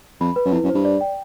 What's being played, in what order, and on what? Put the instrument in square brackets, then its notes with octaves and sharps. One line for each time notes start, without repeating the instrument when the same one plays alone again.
[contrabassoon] F2 [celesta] B5
[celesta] B4
[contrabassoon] F#2
[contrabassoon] F2 [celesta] E4
[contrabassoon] F#2
[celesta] C5
[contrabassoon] G2
[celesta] D5
G5